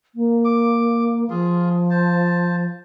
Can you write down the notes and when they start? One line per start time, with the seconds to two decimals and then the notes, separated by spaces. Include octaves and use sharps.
0.15 A#3
0.45 D6
1.30 F3 F4 G#4
1.90 C5 A5